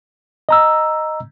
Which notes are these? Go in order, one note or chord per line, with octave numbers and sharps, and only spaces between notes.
D#5 A#5 E6